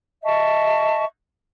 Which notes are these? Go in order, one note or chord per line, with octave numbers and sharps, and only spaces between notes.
D#5 E5 A5 C#6